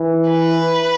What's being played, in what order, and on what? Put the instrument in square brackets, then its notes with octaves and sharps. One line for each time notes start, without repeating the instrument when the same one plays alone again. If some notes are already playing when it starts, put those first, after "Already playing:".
Already playing: [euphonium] E3
[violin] B4